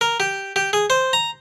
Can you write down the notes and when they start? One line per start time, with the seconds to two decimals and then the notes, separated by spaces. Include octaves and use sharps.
0.01 A#4
0.20 G4
0.56 G4
0.73 G#4
0.90 C5
1.13 A#5